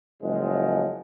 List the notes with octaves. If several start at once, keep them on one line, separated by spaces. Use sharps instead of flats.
F#1 A2 F3 G#3